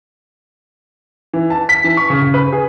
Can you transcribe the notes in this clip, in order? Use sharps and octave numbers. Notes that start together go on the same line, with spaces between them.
E3
A5
B6
E3
C#6
C#3
C#3
B4
G#4